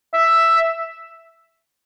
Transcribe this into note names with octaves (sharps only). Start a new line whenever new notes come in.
E5